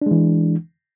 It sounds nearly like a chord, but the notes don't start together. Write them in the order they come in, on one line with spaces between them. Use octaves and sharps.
D4 G#3 E3